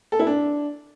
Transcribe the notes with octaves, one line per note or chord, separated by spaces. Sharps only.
A4
E4
D4